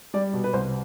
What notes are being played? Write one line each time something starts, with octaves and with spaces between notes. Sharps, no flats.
G3 D5
B2
B4
C2 C5